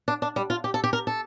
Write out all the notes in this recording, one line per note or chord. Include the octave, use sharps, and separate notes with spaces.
D4
D4
G3
F4
G4
A4
G4
A#4
A4